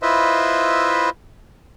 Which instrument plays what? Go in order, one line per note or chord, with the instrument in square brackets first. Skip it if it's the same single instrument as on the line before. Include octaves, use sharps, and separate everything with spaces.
[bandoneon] E4 F4 B4 C5 D#5 E5